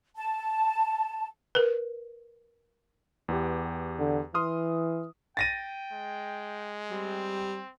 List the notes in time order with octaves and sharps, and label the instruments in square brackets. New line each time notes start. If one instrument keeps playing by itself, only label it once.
[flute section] A5
[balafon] A#4 B4
[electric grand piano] E2 B3 G4
[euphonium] D3
[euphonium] E3 [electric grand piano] C6 D#6 F6
[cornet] G5 [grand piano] A6 A#6 D#7
[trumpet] G#3
[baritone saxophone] G3 [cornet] C4